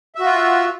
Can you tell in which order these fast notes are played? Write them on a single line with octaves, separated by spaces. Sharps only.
E5 F#4 F4